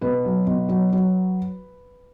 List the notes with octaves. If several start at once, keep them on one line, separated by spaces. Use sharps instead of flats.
B2 B4
F#3
B2
F#3
F#3